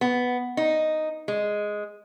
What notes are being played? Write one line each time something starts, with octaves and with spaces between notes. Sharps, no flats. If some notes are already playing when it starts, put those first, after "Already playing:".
B3
D#4
G#3